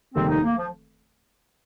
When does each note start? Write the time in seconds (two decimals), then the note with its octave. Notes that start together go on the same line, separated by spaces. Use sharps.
0.15 F1 D#2 D#3 G3 A#3 C4
0.29 D#4
0.43 A#3
0.57 F3